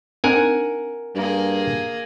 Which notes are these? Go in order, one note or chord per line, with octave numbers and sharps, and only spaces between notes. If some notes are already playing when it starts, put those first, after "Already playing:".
C4 D4 D#4 A#4 F#5 G#5
G2 A#3 G#4